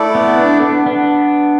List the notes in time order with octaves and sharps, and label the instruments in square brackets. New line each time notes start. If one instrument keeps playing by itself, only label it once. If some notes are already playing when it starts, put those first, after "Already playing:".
Already playing: [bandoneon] A3 E4 A4 D5
[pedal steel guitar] B3
B3 D4
B3 D4
B3 D4